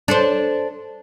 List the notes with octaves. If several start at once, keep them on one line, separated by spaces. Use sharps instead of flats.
D4 A4 C5